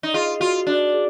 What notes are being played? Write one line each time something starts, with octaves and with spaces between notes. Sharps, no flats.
D#4
F4 G#4
F4 F#4
D4 F#4
G#4